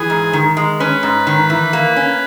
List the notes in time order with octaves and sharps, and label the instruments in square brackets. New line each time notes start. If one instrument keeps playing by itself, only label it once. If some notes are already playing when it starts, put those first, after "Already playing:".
Already playing: [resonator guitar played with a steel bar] E3 [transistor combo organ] G#4
[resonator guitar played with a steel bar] G#2
D#3
G#3
[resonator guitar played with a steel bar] C#4 [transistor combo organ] B4
[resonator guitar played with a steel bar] G#2
D#3
E3
A#3
C#4